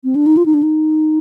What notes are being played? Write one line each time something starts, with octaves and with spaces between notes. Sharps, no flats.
C4
D4
D#4
F4
D#4
D4
D#4